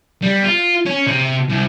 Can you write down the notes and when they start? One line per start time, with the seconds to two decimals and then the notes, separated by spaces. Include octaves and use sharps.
0.23 G3
0.45 F4
0.86 C#4
1.07 C3
1.49 C2